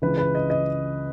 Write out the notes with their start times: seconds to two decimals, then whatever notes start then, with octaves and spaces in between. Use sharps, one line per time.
0.02 C#2 C#3 E3 B4
0.18 B4
0.35 D#5
0.50 D#5